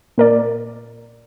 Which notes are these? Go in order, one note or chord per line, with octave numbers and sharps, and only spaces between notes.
A#2 A#4 D5